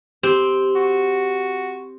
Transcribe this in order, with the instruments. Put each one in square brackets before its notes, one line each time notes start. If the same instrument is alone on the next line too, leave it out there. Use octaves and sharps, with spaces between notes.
[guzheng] C4 [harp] G4
[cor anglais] F#4